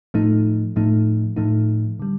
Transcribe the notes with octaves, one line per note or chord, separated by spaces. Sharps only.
A2 F3 A3 D#4
A2 F3 A3 D#4
A2 F3 A3 D#4
D3 G3